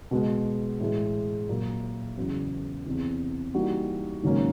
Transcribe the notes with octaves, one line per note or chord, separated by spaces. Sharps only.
B2 G#3 B3
A2 E3 G#3
A#2 F#3 A#3
E2 C#3 F#3 B3
E2 C3 E3
E3 G3 A#3 D#4 F#4
G#2 D#3 F#3 A#3 C#4